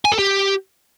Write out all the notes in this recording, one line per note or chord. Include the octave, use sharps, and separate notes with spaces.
G#5
A4
G4